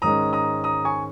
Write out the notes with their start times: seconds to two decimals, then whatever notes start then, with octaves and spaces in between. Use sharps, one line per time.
0.02 G#2 D#3 G#3 C#4 A#5 D#6
0.33 A#5 D#6
0.64 A#5 D#6
0.85 G#5 C#6